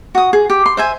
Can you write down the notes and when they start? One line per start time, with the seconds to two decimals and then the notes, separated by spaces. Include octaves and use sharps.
0.15 F#4 D#6
0.33 G#4
0.50 G4
0.66 C6
0.77 C5 E5 G#5